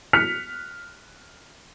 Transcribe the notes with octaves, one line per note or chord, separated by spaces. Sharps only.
F6 F#6 B6 C#7 F7